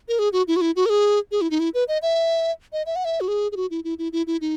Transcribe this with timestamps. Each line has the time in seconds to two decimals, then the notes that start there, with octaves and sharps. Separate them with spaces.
0.08 A#4
0.19 G#4
0.33 F#4
0.48 E4
0.56 F#4
0.61 E4
0.76 F#4
0.86 A#4
0.90 G#4
1.32 G#4
1.41 E4
1.51 D#4
1.60 E4
1.74 B4
1.88 D#5
2.02 E5
2.73 D#5
2.86 E5
2.96 F#5
3.05 E5
3.21 F#4
3.28 G#4
3.52 G#4
3.57 F#4
3.71 E4
3.84 E4
3.99 E4
4.13 E4
4.27 E4
4.41 D#4